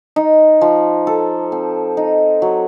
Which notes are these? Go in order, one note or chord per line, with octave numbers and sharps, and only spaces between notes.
D#4
F3
A4
C4
D#4
F#3